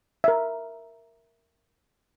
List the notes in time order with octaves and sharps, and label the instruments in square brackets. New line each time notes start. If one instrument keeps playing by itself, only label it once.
[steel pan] A#4 E5